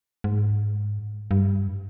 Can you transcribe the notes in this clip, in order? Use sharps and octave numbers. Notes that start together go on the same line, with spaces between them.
G#2
G2